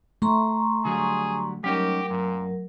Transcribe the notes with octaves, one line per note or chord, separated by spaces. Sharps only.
A3 A#5 C6 C#6
D3 F#3 G3 G#4
F#3 G3 C#4 D#4 G4 A#4
F#2 A#2